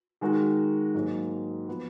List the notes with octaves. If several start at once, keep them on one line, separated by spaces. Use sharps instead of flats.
D#3 G#3 D#4 F#4 A#4
G#2 F#3 A#3
F3 B3